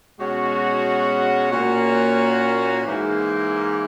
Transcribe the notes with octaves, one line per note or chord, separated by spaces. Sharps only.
B2 G#3 C#4 F#4
A#2 A#3 C#4 F#4
G#2 E3 A#3